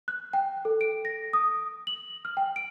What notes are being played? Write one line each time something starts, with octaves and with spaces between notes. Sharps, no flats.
F#6
G5
A4
D7
A#6
D#6
F#7
F6
G5
D7